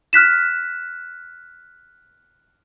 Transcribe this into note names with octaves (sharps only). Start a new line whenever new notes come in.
F6 F#6 B6 E7